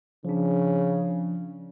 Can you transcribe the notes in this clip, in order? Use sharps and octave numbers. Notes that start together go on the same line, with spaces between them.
C#3 F3 D4